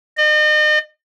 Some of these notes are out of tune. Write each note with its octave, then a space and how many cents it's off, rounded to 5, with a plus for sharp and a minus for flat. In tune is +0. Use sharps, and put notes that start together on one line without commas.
D#5 -40